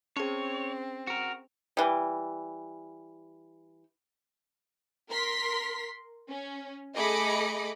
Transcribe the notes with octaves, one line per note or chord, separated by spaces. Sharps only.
C4 C#4 G#4 C#5
F#4 A#4
E3 G3
A#4 C6 B6
C#4
A3 G#4 D#5 B5 D6 C#7